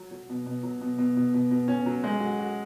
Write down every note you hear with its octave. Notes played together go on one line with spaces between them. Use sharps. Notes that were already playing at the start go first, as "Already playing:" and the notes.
Already playing: F#3
F#3
B2
B2
F#3
B2
B2
B2
B2
B2
C#4
F#3
G#3
F#4
F#4